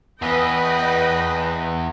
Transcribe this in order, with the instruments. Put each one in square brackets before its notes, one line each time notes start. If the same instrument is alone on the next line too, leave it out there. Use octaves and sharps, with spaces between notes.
[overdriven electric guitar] E2 [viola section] B4 D#5 G5